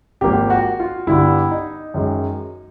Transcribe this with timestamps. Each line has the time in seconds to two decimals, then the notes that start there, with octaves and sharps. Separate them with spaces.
0.21 G#1 G#2 F3 A#3 G4
0.50 F#4
0.80 F4
1.07 G2 D3 G3 B3 E4
1.51 D#4
1.94 F#2 D#3 G#3